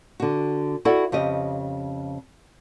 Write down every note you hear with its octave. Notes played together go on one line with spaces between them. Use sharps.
D3 F#4
E4 F#4 A4 D5 F#5
F2 C#3 G4 D#5